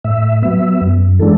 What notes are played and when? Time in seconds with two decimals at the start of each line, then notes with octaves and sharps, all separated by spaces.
0.04 A2 E5
0.42 F#3 B3 E5
0.81 F#2
1.19 E3 G#3 D4 A4